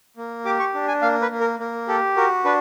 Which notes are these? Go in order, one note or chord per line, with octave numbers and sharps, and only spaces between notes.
A#3
G4 D6
C#6
D4
G#5
A#3 F5
B4
A#3
A#4
A#3
G4 A4
F#4 A#4
D4 B4